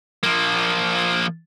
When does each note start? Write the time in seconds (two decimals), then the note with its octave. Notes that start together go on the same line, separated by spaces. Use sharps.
0.24 F3 A#3